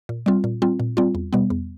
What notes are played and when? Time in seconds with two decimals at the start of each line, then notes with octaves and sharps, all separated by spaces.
0.09 A#2
0.26 G3 C4 F4
0.44 A#2
0.62 G3 C4 F4
0.80 A#2
0.97 G3 C4 F4
1.15 E2
1.33 B2 G3 B3
1.50 E2